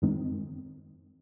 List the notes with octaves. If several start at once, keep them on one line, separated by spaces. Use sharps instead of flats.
F#2 D#3 G#3 C4